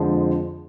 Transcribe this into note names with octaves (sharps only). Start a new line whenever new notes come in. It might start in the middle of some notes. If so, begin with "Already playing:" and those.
Already playing: F2 D3 F3 G#3 C4